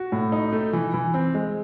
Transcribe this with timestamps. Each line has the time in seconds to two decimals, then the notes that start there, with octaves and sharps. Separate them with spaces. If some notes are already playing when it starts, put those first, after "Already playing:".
Already playing: F#4
0.12 A2
0.32 D#4
0.52 A3
0.73 E3
0.94 E3
1.14 C4
1.34 G#3